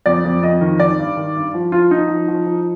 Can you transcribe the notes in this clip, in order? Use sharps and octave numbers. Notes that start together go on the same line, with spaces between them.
F2 D5
F2
F2 D#5
D#3
D#3 D5
G2
D#3
G2
F3
F3 F4
F3 D#4
F3
F3
F3